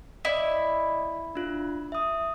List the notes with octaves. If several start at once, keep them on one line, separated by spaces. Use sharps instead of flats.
E4 D5 D#5
D4 F4
E5 D#6